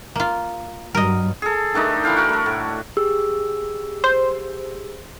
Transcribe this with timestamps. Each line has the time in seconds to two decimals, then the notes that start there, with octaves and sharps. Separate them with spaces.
0.16 A#3 F4
0.95 G2 F#3 G3 A#4 D#5
1.42 G#4 A4
1.74 D#3 A3 D4 D#4
2.04 E3 E4 F5 G5
2.17 F#4 A#4
2.29 A3 A#4
2.46 A2
2.97 G4 G#4 E6
4.04 C5